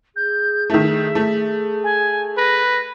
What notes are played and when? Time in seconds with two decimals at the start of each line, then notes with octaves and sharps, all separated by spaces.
0.16 G#4 G6
0.70 D#3 A3 E5
1.15 A3
1.83 G#5
2.37 B4 A#6